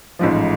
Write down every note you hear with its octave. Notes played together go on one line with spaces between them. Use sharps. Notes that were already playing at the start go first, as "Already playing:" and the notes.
A1 G#2 F3